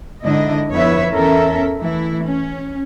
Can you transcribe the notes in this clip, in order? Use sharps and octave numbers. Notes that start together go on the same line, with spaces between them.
G#2 D3 D4 E4 D#5
F2 B3 E4 B4 C#5 E5
E2 C#4 A4 A#4 E5
E3 A3 E4
C#4